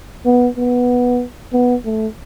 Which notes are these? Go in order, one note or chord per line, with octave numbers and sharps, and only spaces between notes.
B3
B3
B3
A3